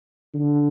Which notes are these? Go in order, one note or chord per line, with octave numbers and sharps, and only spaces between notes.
D3